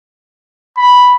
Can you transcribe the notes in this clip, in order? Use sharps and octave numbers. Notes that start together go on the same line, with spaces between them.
B5